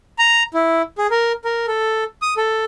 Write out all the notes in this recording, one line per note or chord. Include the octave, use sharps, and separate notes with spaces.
A#5
E4
G#4
A#4
A#4
A4
D#6
A4